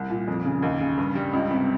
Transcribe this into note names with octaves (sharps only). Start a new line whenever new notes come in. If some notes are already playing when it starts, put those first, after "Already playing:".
Already playing: C2
A#2
F2
C#3
D#2
C#3
G2
G3
C#2
C3